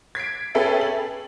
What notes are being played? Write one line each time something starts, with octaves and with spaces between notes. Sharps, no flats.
G#6 B6 C7 D7
C#4 G#4 A4 B4 E5 G5
F#7